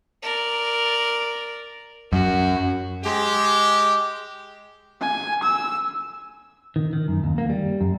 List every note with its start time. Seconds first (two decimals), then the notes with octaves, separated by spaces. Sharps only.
0.23 A#4 D5
2.12 F#2 F#4
3.04 G#3 G4
5.01 G#5
5.43 E6
6.76 D#3
6.93 D#3
7.08 F#2
7.24 D#2
7.38 A#3
7.49 G3
7.81 F#2